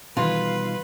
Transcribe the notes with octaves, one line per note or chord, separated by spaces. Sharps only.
B2 D#3 E3 G3 B3 D#4 F4 B4